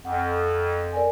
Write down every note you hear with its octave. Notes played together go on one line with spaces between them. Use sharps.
F2 F#5
A#4 D5 G#5